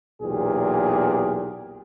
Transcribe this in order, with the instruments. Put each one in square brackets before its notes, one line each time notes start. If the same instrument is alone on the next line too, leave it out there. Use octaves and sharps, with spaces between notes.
[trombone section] B1 E2 A#2 G4 G#4